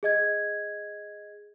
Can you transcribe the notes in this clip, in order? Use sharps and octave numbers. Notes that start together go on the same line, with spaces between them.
G#4 D#5 G#6